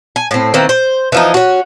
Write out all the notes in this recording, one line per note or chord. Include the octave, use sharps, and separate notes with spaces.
G#5
A2 C4
D#3 E3 A#3 C4
C5
E3 F3 D#4
C#4 F#4